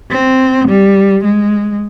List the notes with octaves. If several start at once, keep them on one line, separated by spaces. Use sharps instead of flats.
C4
G3
G#3